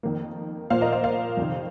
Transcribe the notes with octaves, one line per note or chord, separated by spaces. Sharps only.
F2 D#3 A#3
A#2 F3 A#3 C5 F5
A#4 D#5
C5 F5
C5 F5
F2 C3 D#3